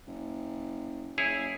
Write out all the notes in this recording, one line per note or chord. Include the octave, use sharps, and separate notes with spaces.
F#1
F#1 E4 G#4 C#5